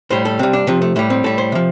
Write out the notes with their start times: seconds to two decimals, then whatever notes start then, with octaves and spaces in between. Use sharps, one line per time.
0.10 A2 G3 C5
0.25 A4
0.39 C3 G3 C4
0.53 D4
0.67 C3 F3 C4
0.82 A3
0.96 A2 G3 A3
1.10 C4
1.24 A2 G3 A4
1.38 C5
1.52 C3 F3